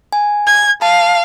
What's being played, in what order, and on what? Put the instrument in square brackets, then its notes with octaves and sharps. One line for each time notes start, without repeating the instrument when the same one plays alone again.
[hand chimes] G#5
[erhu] G#6
[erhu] F5 [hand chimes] A5